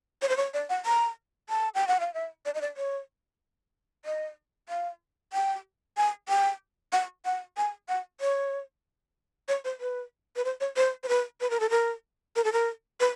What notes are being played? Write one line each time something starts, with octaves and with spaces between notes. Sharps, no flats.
C#5
C5
C#5
D5
F#5
A#5
A5
G5
F#5
F5
E5
D5
D#5
D5
C#5
D#5
F5
G5
G#5
G5
F#5
F#5
G#5
F#5
C#5
C#5
C5
B4
B4
C5
C#5
C5
C5
B4
B4
A#4
A4
A#4
A#4
A4
A#4
B4